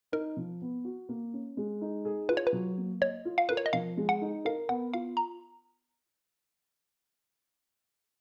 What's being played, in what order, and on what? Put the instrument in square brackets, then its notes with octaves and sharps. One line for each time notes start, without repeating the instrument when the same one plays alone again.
[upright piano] D#4 [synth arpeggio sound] A#4
[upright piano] F3
B3
F#4
A#3
C#4
G#3
D#4
G#4
[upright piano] F4 [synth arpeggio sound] B4
[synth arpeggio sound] C#5
B4
[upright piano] F#3
A#3
[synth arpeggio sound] C#5 [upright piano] D#5
[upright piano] F4
[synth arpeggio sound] F5
[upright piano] A#4 [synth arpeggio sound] B4
[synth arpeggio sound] C#5
D#5
[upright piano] F3 [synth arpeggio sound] F5
[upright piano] G#3
[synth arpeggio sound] F#5
[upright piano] D#4
[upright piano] A#4 [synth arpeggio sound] F5
[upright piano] B3 [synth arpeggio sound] F#5
[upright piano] F4 [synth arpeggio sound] F5
[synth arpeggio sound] A#5